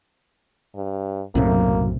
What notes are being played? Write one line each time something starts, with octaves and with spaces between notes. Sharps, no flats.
G2
B1 F#2 A2 C3 A#3